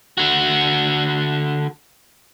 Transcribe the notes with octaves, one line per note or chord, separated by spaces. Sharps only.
D3 F#4